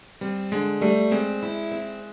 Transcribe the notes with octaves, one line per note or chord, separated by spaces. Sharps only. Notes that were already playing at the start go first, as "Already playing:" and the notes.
G3 C4
D3 G#3
G3 A3
G#3 C4
E4
C4